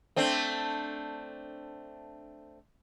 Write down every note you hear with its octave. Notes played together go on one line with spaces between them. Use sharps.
A3 C4 D4